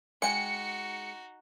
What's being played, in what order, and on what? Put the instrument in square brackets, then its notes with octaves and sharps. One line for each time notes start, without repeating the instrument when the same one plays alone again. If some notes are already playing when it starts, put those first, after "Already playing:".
[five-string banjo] G#3 G5 [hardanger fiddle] D#4 F#4 [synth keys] C#7